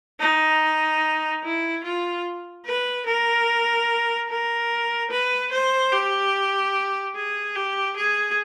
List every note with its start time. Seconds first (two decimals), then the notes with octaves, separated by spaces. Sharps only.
0.20 D#4
1.43 E4
1.84 F4
2.66 B4
3.06 A#4
4.29 A#4
5.11 B4
5.52 C5
5.92 G4
7.16 G#4
7.55 G4
7.97 G#4